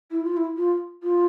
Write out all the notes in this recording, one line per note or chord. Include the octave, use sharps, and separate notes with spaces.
E4
F4
E4
F4
F4